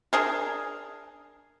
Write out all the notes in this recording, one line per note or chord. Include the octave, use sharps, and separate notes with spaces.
D4 G#4 A#4